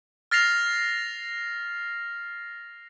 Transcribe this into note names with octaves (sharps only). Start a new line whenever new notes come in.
F6 A6 A#6 C7 F7